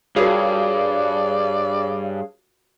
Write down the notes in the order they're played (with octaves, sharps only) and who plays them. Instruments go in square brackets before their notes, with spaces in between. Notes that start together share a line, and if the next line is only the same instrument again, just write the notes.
[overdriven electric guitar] G2 [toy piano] F4 F#4 A#4 [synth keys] G#4 C#5 F5 [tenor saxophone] D5